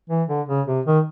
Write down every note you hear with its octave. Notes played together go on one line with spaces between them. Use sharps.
E3
D3
C#3
C3
D#3